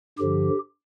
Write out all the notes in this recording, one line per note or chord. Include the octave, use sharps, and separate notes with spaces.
G2 D3 F3 G4